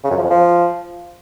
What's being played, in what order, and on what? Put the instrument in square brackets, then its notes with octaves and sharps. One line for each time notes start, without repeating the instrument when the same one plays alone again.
[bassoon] C#3
F#2
F3
F2
F3